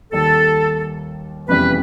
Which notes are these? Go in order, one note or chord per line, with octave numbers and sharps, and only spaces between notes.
D#2 D#3 G3 A4
F1 E2 C#3 E3 G3 B4